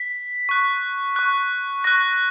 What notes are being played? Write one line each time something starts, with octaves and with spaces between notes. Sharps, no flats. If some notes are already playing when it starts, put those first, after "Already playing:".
Already playing: B6
C#6 F#6
C#6 F#6
C#6 F#6 A#6